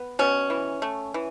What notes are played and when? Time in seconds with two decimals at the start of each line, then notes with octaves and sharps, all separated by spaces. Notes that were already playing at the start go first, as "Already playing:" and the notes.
Already playing: B3
0.19 B2 C#4
0.50 E3
0.82 A3
1.14 E3